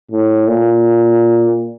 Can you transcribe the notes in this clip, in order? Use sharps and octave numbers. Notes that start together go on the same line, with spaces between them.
A2
A#2